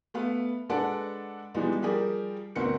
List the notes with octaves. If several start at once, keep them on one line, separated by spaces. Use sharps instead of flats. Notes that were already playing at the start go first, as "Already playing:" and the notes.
A3 B3 F5
G#3 D4 A4 B4 D5 F#5
E3 F3 G3 G#3 B3 D#4
F3 G3 G4 G#4 A#4
G1 D2 C4 A#4 B4 C#7